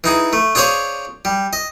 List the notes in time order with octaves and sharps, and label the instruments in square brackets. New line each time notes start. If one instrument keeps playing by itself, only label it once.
[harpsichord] E3 D#4 G#4
A3
D4 G#4 C5 C#5 F5 G#5
G3
D#5